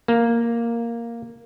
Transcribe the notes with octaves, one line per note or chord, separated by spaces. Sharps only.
A#3